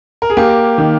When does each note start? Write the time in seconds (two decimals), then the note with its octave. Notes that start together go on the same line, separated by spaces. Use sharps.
0.22 A#4
0.30 G#4
0.37 A#3 G4
0.78 D#3